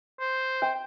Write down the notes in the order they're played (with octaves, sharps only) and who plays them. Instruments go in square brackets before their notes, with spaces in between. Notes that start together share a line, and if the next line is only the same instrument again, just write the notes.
[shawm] C5
[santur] G5